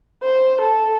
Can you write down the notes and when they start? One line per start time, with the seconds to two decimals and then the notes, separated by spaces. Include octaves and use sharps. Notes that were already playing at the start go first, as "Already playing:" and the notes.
0.23 C5
0.61 A4